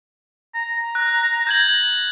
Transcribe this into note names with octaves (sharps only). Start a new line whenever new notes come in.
A#5
F#6
G6 G#6 F#7